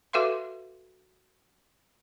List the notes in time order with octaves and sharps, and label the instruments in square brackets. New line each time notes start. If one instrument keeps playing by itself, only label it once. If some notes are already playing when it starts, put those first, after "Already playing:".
[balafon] F#4 A4 B4 E5 F5 C6